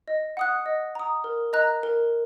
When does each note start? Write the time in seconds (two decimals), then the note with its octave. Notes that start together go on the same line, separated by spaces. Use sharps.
0.08 D#5
0.37 F#5 D#6 F#6
0.66 D#5
0.95 A#5 D#6
1.24 A#4
1.53 D#5 A#5 F#6
1.83 A#4